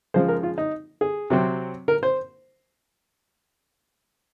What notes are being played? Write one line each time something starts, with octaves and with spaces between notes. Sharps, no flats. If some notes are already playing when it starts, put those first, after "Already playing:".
C#3 F3 G#3 C5
A#4
F4
D#4
G#4
C3 F#3 C4
A#4
C5